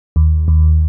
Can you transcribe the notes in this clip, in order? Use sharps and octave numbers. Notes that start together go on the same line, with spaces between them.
D#2
D#2